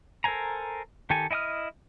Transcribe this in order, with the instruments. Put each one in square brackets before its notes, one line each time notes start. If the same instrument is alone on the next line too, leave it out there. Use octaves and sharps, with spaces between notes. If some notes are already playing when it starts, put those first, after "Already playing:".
[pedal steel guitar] A4 A#4 C5 G#5 A#5
D#3 G4 A4 G#5
E4 D#5 G5 D#6 F6